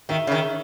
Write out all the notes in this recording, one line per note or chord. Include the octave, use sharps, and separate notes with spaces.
D#3 E5
C#3
D#3